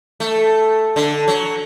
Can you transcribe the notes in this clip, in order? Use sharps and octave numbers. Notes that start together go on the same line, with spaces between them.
A3
D3
F#3